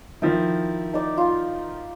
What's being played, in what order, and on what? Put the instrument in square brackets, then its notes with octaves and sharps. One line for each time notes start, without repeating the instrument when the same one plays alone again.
[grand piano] D#3 F3 [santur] E4
[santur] D#4 D5
F4